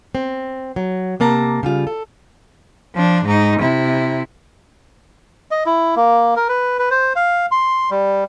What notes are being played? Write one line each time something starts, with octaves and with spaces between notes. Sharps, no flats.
C4
F#3
C3 A#3 A5 A#5
C#3 G3 F4
A4
F3 D4
G#2 D#4
C3 E4
D#5
E4
A#3
A#4
B4
B4
C5
F5
C6
G3